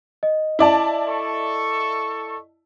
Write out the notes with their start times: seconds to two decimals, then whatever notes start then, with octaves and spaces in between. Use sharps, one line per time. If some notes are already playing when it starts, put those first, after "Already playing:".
0.23 D#5
0.59 E4 D5 A5
1.08 A4 C#6